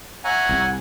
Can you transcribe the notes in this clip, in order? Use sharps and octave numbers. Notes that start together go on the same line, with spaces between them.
C#5 E5 F#5 G#5 A#5
C2